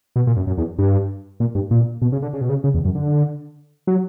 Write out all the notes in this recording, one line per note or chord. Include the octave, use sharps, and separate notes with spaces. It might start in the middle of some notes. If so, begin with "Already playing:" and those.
B2
A#2
F#2
F#2
E2
G2
A#2
G2
A#2
B2
C#3
D3
C#3
B2
C#3
C#3
E2
F#2
D3
F#3